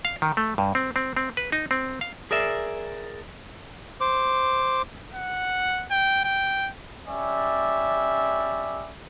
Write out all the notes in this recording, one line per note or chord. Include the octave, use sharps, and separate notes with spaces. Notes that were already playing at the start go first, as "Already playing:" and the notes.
F5
D#3
A3
G2
C4
C4
C4
B4
D#4
C4
F5
G#4 A#4 D5 E5
C5 D6
F#5
G5
G5
G3 C#4 D5 E5